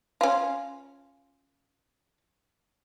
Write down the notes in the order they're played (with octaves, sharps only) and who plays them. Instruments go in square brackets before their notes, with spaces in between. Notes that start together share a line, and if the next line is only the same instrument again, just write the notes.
[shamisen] C#4 F4